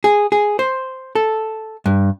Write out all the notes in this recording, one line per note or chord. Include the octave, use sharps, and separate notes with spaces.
G#4
G#4
C5
A4
G2